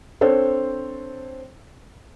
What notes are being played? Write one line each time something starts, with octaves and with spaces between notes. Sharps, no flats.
C4 D4 A4 C5 C#5